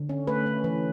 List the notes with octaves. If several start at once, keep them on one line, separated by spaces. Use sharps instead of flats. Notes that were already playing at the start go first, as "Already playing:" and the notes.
Already playing: D3
C#4
A3 B4
C#4
E3